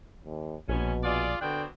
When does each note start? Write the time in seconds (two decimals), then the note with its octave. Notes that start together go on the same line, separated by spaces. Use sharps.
0.24 D#2
0.68 A#1 G#2 B2 B3 C#4
1.04 F4 G#4 D5
1.41 B2 D3 C4 D4 G5